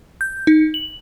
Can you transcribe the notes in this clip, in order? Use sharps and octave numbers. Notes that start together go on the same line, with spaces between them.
G6
D#4
F#7